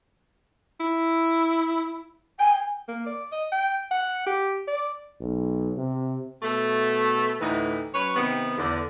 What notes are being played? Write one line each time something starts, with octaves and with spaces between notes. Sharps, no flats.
E4
G5 G#5
A#3
D5
D#5
G5
F#5
G4
D5
B1
C3
B2 A3
D2 A2 E3 D#4
F#2 B4 C#5
C3 D#3 B3
E2 D3